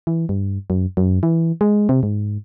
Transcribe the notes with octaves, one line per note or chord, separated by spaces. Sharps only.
E3
G2
F#2
F#2
E3
G#3
C3
G#2